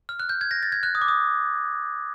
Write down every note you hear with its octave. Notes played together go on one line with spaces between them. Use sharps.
F6
F#6
G6
G#6
A#6
A6
G#6
F#6
D#6
D6
D#6